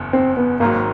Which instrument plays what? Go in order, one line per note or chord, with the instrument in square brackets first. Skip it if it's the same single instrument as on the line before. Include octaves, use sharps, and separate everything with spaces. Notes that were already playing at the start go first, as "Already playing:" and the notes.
Already playing: [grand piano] F#1 E2
[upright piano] C4
B3
[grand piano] G#1 G#2 D#3 F#3 [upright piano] A#3